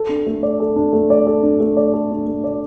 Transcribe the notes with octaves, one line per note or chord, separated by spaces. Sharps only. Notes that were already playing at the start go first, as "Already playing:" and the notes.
Already playing: A4
D4
A3
D5
A4
D4
A3
D5
A4
D4
A3
D5
A4
D4
A3
D5